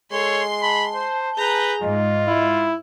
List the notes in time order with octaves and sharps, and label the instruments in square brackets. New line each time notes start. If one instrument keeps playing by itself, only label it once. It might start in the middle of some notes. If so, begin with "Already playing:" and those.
[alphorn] G#3 [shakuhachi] A4 [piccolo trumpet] C#5 [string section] C6
[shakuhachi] A5 [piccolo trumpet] B5
[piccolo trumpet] C5
[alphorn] G#4 [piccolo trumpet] B4 [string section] A#5 G6
[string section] G#2 [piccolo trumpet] F4 [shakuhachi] D#5
[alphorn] E4